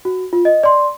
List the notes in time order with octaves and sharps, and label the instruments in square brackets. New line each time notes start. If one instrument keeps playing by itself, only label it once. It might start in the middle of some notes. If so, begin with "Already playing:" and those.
[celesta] F#4
F4
D#5
D5 C6